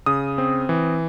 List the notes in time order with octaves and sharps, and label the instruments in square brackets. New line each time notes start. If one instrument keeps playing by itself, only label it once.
[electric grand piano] C#3 D#6
C4
E3